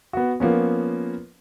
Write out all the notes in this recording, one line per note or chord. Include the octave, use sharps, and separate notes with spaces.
B3 F#4
F3 A#3 B3 C#4